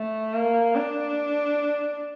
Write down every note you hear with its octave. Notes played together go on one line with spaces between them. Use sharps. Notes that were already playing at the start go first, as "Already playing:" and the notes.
Already playing: A3
A#3
D4